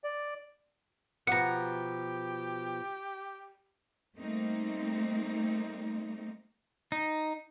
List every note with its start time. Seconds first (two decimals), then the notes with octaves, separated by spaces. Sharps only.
0.04 D5
1.27 B2 F3 G4 F#5 A#5 C#7
4.16 G3 A3 A#3 C4 D#4
6.92 D#4